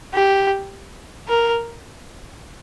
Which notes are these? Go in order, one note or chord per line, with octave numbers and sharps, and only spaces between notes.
G4
A#4